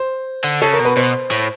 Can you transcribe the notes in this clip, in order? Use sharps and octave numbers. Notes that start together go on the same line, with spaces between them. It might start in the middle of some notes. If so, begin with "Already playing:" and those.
Already playing: C5
D3
C#3 A4
A#4
B2
B4
B2 C5
A2